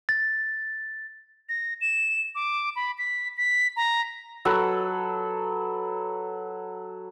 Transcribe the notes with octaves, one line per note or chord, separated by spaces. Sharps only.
A6
A#6
E7
D6
B5
B6
B6
A#5
F#3 A4 B4